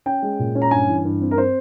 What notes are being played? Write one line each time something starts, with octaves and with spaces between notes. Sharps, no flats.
C#4 G5
G#3
A#2
C#4
A#5
G2 G#5
E3
G2
C4
A#4
C4 C5